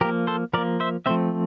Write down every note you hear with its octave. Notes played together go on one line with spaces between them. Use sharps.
F3 A#3 G4 A#4
A4 C5
F3 A#3 A#4 D5
C5 E5
F3 A3 C4 C5 E5